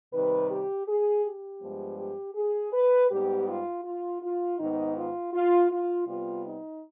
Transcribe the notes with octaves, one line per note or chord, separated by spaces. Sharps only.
C3 D#3 G3 B4
G4
G#4
G4
G2 F3 G#3 B3
G4
G#4
B4
G#2 G3 B3 G4
F4
F4
F4
G#2 D#3 B3 D#4
F4
F4
F4
C3 G3 B3 F4
D#4